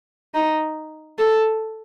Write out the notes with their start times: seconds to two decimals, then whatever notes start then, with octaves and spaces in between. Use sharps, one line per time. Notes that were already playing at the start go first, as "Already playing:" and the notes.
0.34 D#4
1.19 A4